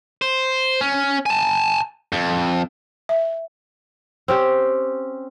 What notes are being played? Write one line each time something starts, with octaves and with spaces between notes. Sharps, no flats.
C5
C#4
G#5 A5
F2
E5
C4 C#4 G4